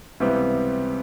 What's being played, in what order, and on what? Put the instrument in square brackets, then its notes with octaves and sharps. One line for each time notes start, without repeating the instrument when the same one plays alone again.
[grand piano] C#2 C3 E3 G3 B3